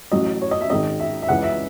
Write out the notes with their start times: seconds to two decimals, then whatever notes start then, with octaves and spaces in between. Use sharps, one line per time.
0.12 A1 A2 F#3 D#5
0.41 C#5
0.51 D#5
0.61 E5
0.70 G#1 G#2 D#3 D#5
1.00 E5
1.22 E5
1.28 C#2 C#3 E3 F#5
1.43 E5